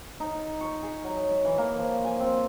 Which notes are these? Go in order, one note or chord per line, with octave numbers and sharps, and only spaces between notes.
D#4
C#6
G#4
F#3
E5
E3
A#3
F3
G#5
C4